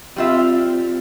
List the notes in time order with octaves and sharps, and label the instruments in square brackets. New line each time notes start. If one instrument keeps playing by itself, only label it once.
[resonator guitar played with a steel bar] G3 F4 E5 [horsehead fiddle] C4